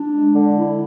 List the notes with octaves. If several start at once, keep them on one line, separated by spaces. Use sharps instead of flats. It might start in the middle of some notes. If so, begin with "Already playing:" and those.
Already playing: D4
G#3
D3
E4